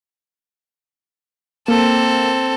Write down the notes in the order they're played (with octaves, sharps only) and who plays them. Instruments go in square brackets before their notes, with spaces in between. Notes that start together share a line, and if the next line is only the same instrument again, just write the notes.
[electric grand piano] A#3 [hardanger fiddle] C4 A4